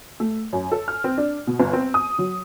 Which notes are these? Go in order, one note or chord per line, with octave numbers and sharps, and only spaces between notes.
A3
F#2
A4
F6
C4
D4
B2
G1
C4
D#6
F#3